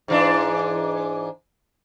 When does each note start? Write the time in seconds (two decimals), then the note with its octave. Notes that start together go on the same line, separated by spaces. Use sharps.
0.08 G#2 E3 D4